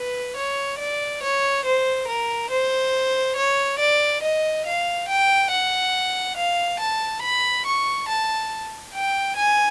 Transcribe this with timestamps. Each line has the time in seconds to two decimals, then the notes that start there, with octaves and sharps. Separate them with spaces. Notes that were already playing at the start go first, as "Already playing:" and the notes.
Already playing: B4
0.36 C#5
0.79 D5
1.23 C#5
1.65 C5
2.08 A#4
2.51 C5
3.36 C#5
3.79 D5
4.23 D#5
4.66 F5
5.09 G5
5.51 F#5
6.37 F5
6.80 A5
7.22 B5
7.66 C#6
8.09 A5
8.94 G5
9.37 G#5